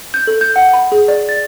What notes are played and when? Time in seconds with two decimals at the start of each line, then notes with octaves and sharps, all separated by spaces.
0.14 G6
0.27 A4
0.41 G6
0.56 F#5
0.73 B5
0.92 G#4
1.08 D5
1.29 A6